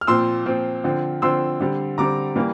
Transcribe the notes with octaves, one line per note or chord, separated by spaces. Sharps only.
F6
A#2 F3 C4 C6 E6
A#2 F3 C4
D3 F3 C4
D3 F3 C4 C6 E6
D3 G3 C4
D3 G3 C4 A#5 D6
E3 G3 A#3